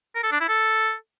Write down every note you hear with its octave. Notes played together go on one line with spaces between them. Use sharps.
A#4
A4
D4
E4
A4